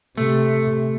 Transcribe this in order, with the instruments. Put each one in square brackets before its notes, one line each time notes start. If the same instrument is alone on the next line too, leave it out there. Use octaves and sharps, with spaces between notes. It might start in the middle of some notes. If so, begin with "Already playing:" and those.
[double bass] C3 [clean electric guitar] A3